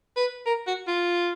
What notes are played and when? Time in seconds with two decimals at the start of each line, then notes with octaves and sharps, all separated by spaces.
0.16 B4
0.46 A#4
0.67 F#4
0.88 F4